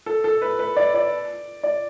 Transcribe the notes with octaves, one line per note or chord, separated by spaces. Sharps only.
A4
A4
B4
B4
D5
D5
D5